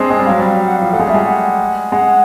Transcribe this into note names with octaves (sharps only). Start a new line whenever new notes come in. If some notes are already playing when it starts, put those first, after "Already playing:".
Already playing: G#3 C4 D4
G#3
G3
F#3 F5
G3
F5
F#5
F3 F5
A3 F#5
G#3
G3 E5
G#3
F#5
G#3 F#5